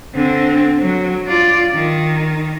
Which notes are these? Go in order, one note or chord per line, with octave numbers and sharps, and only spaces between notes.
D3 C4
F#3
F4 D5
D#3